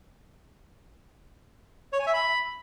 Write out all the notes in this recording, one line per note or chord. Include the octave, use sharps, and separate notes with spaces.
C#5
G#5
E5
B5